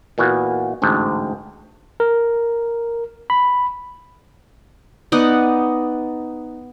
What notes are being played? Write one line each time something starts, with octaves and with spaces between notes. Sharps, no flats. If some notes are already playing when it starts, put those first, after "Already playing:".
A#2 E3 B3 F#4
A1 D2 G#2
A#4
B5
B3 D#4 D5 F#5